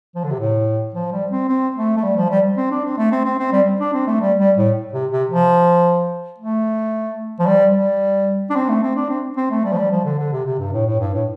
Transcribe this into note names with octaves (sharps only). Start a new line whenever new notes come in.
F3
D3
C3
A2
F3
G3
C4
C4
A3
A3
G3
F3
G3
C4
D4
C4
A3
C4
C4
C4
G3
D4
C4
A3
G3
G3
A2
C3
C3
F3
A3
F3
G3
G3
D4
C4
A3
C4
D4
C4
C4
A3
G3
F3
G3
F3
D3
D3
C3
C3
G2
A2
A2
G2
A2